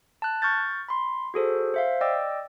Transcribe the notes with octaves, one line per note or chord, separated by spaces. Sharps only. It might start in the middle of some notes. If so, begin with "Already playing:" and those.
A5 F#6
C#6 F6 G6 A6
B5 C6
F#4 G#4 A4 C5
C5 E5 F5
D5 D#5 G5 D6 E6